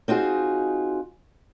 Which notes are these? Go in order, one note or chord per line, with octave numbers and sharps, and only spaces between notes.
C4 D#4 F4 F#4 G#4